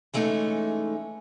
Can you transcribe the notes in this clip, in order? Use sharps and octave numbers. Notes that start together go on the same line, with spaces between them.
E3 G#3 A3 C#4 D#4